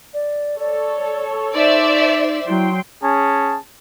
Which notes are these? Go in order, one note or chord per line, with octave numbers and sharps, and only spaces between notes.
D5
A4 C#5 D5
D#4 C5 D5 E5
F#3 E4 G5 C6
C#4 G#4 A5